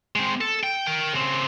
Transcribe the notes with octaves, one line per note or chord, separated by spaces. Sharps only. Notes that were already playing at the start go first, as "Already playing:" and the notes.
G#3 C4
A4
G5
A#4 G5
C#3 C4